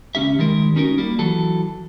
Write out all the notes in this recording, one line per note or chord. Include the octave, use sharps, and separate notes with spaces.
C#2 C#4 G4 E5
D#3 G3 G#3 A#4
C#4 D#4 F#4 A#4
G3 A#3
E3 F#3 A4